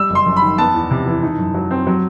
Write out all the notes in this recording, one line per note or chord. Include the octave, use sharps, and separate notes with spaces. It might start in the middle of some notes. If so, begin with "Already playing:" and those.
Already playing: G3 E6
F#1
C6
F#2
B5
D#3
B3 A5
E2
C3
E3
D#4
F#2
F#3
C4
F#3